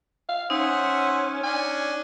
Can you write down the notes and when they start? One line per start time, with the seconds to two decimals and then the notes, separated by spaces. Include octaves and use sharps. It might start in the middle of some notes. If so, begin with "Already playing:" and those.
0.29 F5
0.50 C#4 D#4 C5 E5 F#5
1.43 C#4 D4 G#5